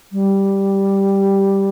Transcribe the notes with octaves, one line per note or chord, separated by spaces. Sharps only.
G3